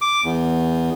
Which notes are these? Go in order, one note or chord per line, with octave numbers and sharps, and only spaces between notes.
D6
E2